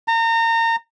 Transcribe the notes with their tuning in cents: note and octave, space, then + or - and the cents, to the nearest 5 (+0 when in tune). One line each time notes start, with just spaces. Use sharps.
A#5 -30